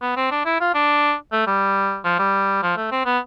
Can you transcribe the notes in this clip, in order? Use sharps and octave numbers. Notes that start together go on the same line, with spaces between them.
B3
C4
D4
E4
F4
D4
A3
G3
F3
G3
F3
A3
C4
B3